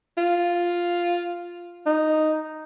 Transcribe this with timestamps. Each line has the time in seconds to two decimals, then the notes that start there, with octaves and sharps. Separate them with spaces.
0.18 F4
1.86 D#4